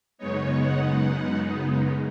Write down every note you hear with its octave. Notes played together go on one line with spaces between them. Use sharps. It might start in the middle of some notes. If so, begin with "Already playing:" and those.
F#2 C#3 G#3 B3 D#4 C#5
F#5